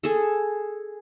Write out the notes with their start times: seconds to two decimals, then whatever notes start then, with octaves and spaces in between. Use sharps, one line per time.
0.03 G#4 A4